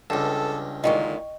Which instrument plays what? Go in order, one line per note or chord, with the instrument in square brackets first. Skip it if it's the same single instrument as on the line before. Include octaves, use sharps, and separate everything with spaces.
[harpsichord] C#2 G2 [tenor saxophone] A4 [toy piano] F#5 G5
[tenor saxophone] A#2 [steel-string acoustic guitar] D3 D#3 G#3 [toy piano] D#5 G5 C#6